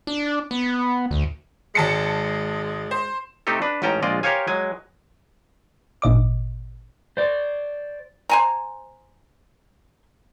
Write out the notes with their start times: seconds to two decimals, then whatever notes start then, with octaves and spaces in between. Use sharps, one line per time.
0.07 D4
0.51 B3
1.11 D2
1.75 G#1 G#3 A5 C#7
2.91 C5
3.47 C3 A3 C4 D#4 G4 A4
3.62 D4 B4
3.82 A1 G#2 C#4 G5 A5 A#5
4.03 A#1 G#3 F4 D5 D#5
4.23 G4 A#4 C5 C#5 F5 G#5
4.47 F#3 G#3 G#5
6.02 G#1 A#2 D#5 D6
7.17 C5 D5
8.30 C5 G#5 A#5